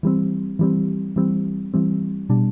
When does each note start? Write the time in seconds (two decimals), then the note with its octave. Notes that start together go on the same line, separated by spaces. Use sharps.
0.03 E3 G3 C4
0.59 E3 G3 C4
1.16 E3 G3 C4
1.74 E3 G3 C4
2.29 B2 G3 D4